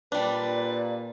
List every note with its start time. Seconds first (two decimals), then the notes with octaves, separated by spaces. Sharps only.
0.12 A#2 G3 D4 B4 D5